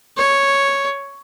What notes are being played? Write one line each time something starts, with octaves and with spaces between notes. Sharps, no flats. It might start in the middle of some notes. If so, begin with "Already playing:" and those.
C#5